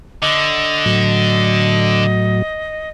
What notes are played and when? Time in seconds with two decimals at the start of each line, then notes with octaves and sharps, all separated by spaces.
0.22 D3 D#5
0.86 A2 F#3